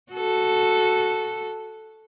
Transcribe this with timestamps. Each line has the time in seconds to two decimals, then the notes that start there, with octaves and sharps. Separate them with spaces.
0.12 F#4 A4